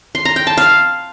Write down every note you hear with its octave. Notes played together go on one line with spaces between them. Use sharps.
C6
A#5
G5
A5
F5